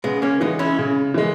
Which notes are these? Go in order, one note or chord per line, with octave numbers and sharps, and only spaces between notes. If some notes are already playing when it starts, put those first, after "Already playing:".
C#3 G#3 B3
A#3 C#4
E3 G#3 B3 D#4
C#4 E4
C#3
E3 G#3